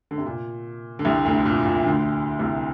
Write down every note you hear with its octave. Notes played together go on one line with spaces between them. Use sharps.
D3
C3
A#2
D3
C2 C3
D2 D3
A#2
A#2
D2 D3
C2 C3